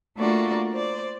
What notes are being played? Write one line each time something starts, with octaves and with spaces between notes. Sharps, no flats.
A3 A#3 D4 F4 F#4 D5
C5 D5